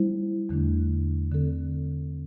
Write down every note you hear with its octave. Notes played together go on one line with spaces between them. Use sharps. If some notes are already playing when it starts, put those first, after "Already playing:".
Already playing: G3 E4 C5
E2 D3 A3 D4
D3 C4 A4